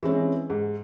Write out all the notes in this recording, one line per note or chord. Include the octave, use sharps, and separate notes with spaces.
E3 G#3 C4 C#4
G#2